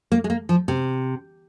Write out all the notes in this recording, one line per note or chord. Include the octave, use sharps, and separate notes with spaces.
A#3
G#3
A#3
F3
C3